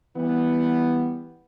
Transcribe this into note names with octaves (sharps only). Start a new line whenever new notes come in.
E3 G3 B3